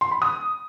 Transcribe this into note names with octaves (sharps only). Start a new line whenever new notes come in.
C6
B5
D#6